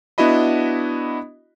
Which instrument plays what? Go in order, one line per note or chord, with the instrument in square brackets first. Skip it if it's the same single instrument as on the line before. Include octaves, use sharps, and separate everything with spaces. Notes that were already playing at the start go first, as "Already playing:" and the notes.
[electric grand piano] B3 D4 E4 F#4 D#5 B5